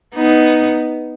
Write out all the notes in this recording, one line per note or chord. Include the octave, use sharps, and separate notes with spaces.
B3 D#4